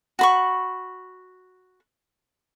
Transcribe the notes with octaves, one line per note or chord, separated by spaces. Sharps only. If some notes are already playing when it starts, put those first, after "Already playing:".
F#4 B5 C#6